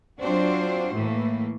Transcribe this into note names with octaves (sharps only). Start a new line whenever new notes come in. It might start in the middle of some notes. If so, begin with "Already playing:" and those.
F#3 C4 D4 F4 F#4 C5
A2 E3 A3 A#3